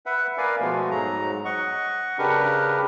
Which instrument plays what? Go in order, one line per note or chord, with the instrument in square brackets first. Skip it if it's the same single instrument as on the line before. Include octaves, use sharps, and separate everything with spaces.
[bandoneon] B4 E5 F#5
A#4 B4 D5 F5 G#5
B2 F3 G#3 A3 B3
G#2 F#3 A#5
D#5 F#5 C#6
C#3 D4 G4 A#4 B4